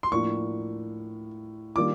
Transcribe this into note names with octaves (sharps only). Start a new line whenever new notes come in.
C6
A2 F3 A#3 D4 C#6
D#3 G3 A#3 D4 F4 D6